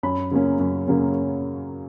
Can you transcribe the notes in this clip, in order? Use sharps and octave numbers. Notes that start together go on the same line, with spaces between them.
F#2 B5
C#3 F#3 A#3 C#4
F#2
C#3 F#3 A#3 C#4